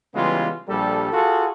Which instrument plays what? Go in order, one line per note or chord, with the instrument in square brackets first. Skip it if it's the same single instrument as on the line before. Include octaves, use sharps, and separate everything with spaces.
[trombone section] C#3 E3 G3 G#3 B3 F4
A#1 G3 A4
F4 F#4 G#4 A4